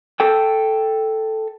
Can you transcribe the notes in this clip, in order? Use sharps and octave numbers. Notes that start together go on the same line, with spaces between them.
A4 G5